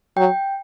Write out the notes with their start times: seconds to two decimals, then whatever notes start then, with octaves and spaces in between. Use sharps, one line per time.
0.17 F#3 G5